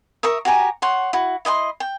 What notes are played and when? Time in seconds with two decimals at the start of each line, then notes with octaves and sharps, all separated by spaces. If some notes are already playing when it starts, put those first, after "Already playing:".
0.23 A#4 E5 C#6 D#6
0.45 F#4 G4 G#5 A#5
0.82 C#5 F#5 C6
1.13 E4 F#4
1.45 E4 D#5 F#5 C6
1.80 G5